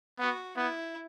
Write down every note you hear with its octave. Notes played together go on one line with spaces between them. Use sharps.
B3 F#4
B3 E4